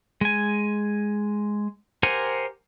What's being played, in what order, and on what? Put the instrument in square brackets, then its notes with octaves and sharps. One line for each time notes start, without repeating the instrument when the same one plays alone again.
[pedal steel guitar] G#3 G#5
G4 A#4 C5 F#5 G#5